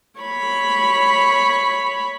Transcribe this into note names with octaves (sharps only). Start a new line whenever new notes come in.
C#5 B5